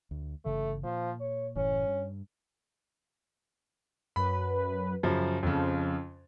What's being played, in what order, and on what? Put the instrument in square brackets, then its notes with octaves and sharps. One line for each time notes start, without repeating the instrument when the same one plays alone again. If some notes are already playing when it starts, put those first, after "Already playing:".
[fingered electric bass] D2
[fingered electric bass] G1 C#3 E3 [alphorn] A3
[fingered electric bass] A#2 [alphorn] F3
[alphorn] C#5
[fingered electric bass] F#1 A2 E3 [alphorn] C#4
[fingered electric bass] G2
[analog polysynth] F#2 B4 [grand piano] B5
[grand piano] F#2 C#3 F3
[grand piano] F2 C#3 [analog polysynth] F3